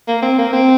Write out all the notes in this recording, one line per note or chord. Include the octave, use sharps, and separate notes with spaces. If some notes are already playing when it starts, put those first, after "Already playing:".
A#3
C4
A#3
C4